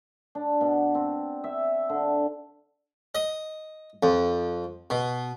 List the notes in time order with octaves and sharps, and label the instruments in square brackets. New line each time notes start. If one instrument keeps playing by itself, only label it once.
[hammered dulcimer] D4
B2
C4
E5
D3
[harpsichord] D#5
F2
B2